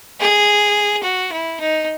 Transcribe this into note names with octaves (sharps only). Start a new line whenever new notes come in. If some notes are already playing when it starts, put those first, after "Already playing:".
G#4
F#4
E4
D#4